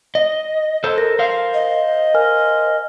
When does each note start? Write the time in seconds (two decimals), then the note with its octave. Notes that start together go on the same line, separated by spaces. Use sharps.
0.15 D#5
0.84 A4 C5
0.98 A#4 A#6
1.19 C5 F5
1.54 D#5
2.14 A#4 G#5 F6